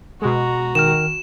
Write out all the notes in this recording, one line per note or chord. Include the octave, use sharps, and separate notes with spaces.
B2 G#3 F#4 A#5
D#3 G5 F6 E7